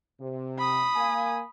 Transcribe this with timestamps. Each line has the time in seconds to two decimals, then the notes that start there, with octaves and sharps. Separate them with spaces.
0.20 C3
0.58 B5 D#6
0.95 A#3 F5 G#5